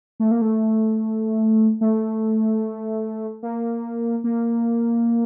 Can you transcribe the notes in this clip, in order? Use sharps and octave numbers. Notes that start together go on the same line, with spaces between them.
A3
A#3
A3
A3
A#3
A#3